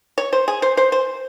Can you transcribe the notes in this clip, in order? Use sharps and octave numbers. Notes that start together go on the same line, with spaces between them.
C#5
C5
G#4
C5
C5
C5